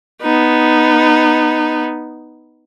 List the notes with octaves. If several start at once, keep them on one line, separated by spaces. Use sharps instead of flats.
B3 D#4